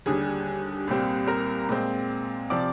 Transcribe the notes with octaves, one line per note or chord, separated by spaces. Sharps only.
D#2 D3 G3 G#4 G#5
C2 A#2 G3 C4
A#4 A#5
A#2 G#3 C4
C3 F3 C4 D5 D6